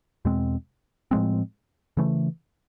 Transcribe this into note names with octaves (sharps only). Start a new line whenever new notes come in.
E2 B2 G#3 C4
A2 F3 G#3 C4
C#3 E3 A3